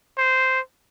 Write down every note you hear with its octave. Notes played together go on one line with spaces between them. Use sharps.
C5